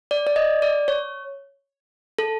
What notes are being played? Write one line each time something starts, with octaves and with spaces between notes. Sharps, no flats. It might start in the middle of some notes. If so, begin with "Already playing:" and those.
D5
D5
D#5
D5
C#5
A4